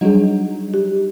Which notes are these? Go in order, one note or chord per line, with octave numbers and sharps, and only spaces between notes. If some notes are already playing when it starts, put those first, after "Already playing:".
F#3 G3 D4 D#4 G#4
G4